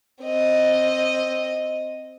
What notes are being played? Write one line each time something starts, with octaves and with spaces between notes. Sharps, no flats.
C4 D#5